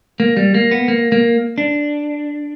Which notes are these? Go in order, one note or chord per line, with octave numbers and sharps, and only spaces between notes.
A#3
G3
A#3
B3
A#3
A#3
D4